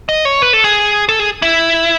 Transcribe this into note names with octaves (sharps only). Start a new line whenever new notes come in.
D#5
C#5
B4
A4
G#4
A4
G#4
E4